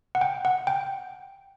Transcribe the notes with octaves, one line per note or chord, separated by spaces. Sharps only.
F#5
G5
F#5
G5